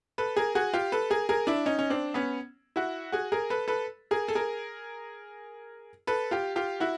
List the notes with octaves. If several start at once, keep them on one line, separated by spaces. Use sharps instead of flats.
A4 B4
G#4 A#4
F#4 G#4
F4 G4
A4 B4
G#4 A#4
G#4 A#4
D4 E4
C#4 D#4
C#4
C4 D4
B3 C#4
E4 F#4
F#4 G#4
G#4 A#4
A4 B4
A4 B4
G#4 A#4
A4
G#4 A#4
A4 B4
F4 G4
F4 G4
E4 F#4